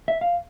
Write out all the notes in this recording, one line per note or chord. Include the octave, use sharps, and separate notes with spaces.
E5
F5